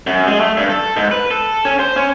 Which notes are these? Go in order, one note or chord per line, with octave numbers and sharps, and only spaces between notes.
F#2
G#3
A3
G2
A4
G#2
B4
A4
C#4
C5
C#4